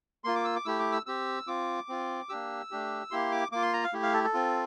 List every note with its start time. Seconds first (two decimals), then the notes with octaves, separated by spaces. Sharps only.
0.24 A#3 F4 C6
0.35 D6
0.44 E6
0.56 D6
0.65 A3 E4 G4 E6
0.79 D6
0.92 E6
1.06 C4 G4 E6
1.47 C4 F4 D6
1.89 C4 F4
2.29 A#3 D4 G4 E6
2.71 A3 D4 G4
3.11 A#3 E4 G4 C6
3.32 D6
3.52 A#3 F4 D6
3.62 C6
3.73 A#5
3.83 F5
3.93 A3 E4 G4
4.03 F5
4.14 A4
4.24 A4
4.34 C4 F4